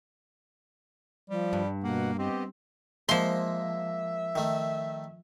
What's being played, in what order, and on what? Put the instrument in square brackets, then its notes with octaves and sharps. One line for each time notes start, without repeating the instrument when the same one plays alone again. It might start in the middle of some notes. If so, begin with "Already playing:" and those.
[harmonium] F3 [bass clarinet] G3
[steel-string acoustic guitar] G2
[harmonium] B2 F#5 [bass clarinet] A#3
[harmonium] B3 G4 D#5 [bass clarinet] C4
[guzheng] F3 C6 [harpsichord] G#3 A#3 C5 [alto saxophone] E5
[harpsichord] D#3 A3